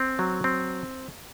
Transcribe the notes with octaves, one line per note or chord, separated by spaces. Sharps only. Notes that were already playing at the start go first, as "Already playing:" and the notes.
Already playing: C4
F#3
C4